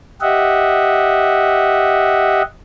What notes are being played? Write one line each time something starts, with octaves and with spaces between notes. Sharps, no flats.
G4 D#5 E5 F#5